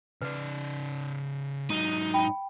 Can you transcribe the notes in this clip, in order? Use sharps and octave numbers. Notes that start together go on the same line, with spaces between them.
C#3 B4 D5
G#2 F#3 D#4
G5 B5